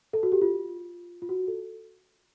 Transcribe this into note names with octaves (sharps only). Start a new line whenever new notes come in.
A4
F#4
G4
F4
F4
F#4
A4